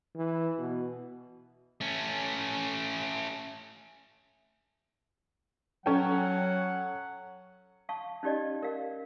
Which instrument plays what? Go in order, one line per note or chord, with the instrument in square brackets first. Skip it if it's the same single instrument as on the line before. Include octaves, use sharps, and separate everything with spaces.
[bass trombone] E3
B2
[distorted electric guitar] A3 C#4
[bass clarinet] F#3 [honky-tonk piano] C#4 A4 G5 [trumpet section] F#5
[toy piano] F5 A5 C#6
C#4 D#4 G4 D5 D#5
A#4 F5